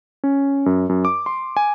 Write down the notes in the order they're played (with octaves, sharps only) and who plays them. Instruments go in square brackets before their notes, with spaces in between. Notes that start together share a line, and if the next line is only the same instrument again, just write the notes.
[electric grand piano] C#4
F#2
F#2
D6
C6
G#5